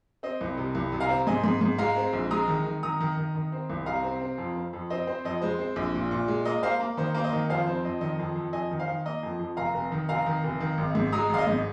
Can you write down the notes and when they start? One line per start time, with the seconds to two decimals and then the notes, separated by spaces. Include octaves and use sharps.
0.23 C4 D#5
0.41 C2
0.57 C3
0.75 C2
0.92 C3
1.00 F5 A#5
1.09 C4
1.27 G#2 D#5 G#5
1.44 G#2
1.61 G#2
1.78 G#3 F5 A#5
1.96 C4
2.13 A#1
2.31 G#3 A#5 D#6
2.48 D#3
2.65 D#3
2.83 D#3 A#5 D#6
3.00 D#3
3.17 D#3
3.35 D#3
3.52 C4
3.70 C2
3.86 C3 F5 A#5
4.03 C4
4.22 C4
4.38 F2
4.56 C4
4.73 F2
4.90 C4 D#5
5.07 C4 C5
5.25 F2 D#5
5.41 G#3 C5
5.59 C4
5.76 A#1
5.94 A#2
6.11 A#2
6.28 G#3
6.45 A#3 D#5
6.63 A#3 C5 F5
6.80 A#3
6.97 D#3 C5
7.14 A#3 C5
7.24 D#5
7.33 D#3
7.49 F2 C5 F5
7.66 C4 C5
7.85 F2 D#5
8.01 D#3 D#5
8.19 F2
8.36 F2
8.53 F2 D#5 G#5
8.71 D#3
8.80 C5 F5
8.89 D#3
9.06 A#3 D#5
9.23 F2
9.39 F2
9.57 F1 F5 A#5
9.74 F1
9.92 D#3
10.09 F1 F5 A#5
10.26 D#3
10.44 F1
10.60 D#3
10.78 G#1
10.95 G#2
11.12 G#3 A#5 D#6
11.30 G#1 F5
11.38 D#5
11.47 G#2